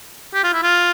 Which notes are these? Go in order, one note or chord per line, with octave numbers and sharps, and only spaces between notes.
G4
F4
E4
F4